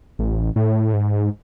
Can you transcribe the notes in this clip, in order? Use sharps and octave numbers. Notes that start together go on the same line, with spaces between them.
A1
A2
G#2